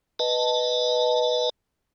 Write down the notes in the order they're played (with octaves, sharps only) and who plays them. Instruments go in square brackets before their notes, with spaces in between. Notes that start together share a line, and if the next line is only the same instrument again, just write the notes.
[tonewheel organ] B4 D#5 A5